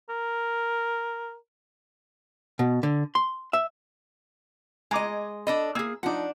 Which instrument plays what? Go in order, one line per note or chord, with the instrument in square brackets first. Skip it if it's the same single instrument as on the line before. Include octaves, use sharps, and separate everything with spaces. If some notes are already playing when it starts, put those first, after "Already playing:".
[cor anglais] A#4
[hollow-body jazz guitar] B2
D3
C6
E5
[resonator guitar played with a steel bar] G#3 D#5 [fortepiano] G#5 A#5 D6
[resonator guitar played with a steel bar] D4 A4 D#5 [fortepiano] B5
[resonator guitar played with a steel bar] A#3 G#4 [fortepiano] E6
[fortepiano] F3 D#4 [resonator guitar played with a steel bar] D4 F#5